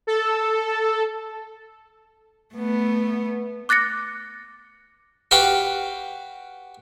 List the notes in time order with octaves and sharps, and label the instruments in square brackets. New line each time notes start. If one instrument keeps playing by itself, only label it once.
[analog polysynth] A4
[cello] A3 B3
[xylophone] D6 F#6 A6 A#6 C#7
[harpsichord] F#4 G4 B4 F5 G5